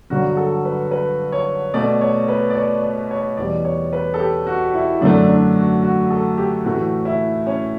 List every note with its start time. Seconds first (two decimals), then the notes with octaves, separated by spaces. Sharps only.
0.10 G2 D3 F#3 F#4
0.37 A4
0.65 B4
0.91 B4
1.32 C#5
1.74 B2 A3 D5
2.01 C#5
2.28 B4
2.50 D5
2.55 C#5
2.83 D5
3.11 C#5
3.37 E2 B2 G3 D5
3.65 C#5
3.93 B4
4.14 A4
4.19 G4
4.47 F#4
4.74 E4
5.01 F#2 D3 A3 D4
5.29 D4
5.55 F#4
5.82 F#4
6.10 A4
6.38 G4
6.64 A2 E3 A3 F#4
7.05 E4
7.47 C#4